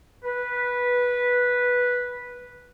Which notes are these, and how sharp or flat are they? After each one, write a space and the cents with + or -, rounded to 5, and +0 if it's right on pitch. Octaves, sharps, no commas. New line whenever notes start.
B4 -10